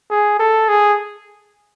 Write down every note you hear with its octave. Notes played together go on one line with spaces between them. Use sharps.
G#4
A4
G#4